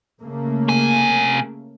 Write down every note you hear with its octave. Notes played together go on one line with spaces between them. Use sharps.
C#3 A3 A#3
C3 G#5